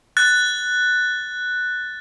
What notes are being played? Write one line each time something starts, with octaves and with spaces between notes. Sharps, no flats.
F#6 A6